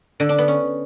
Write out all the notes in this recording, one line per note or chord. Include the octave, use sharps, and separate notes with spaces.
D3
D4
B3
C#4